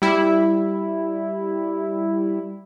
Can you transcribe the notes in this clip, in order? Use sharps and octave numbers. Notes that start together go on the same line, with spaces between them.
G3 E4